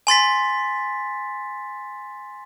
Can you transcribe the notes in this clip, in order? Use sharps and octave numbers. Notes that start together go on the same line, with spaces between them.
G#5 C6 A6 B6